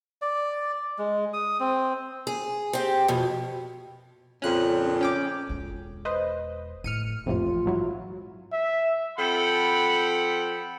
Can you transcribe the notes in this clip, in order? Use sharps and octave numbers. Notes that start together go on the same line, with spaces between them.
D5
G#3
D#6
C4
G#4
C4 G4
F2 B2
F2 A#2 C#3 C#4 F#6
C#4 G5 D6
E1 F4
B4 C5 D#5
A2 F6 C#7 D#7
A#1 F2 A2 C3 E3 F4
G#2 F#3 E4
E5
F3 C4 A4 F#5 G5 B5